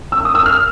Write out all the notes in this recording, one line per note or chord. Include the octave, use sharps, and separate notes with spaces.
E6
D#6
E6
F6